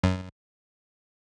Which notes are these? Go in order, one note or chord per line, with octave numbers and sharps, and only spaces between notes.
F#2